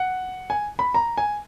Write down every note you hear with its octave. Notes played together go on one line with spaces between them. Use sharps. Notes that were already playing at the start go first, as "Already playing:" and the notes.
Already playing: F#5
G#5
B5
A#5
G#5